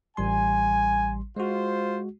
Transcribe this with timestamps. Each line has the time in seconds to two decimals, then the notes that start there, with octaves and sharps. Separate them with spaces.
0.17 A1 G3 G#5 C6
1.36 G#3 F4 F#4 C5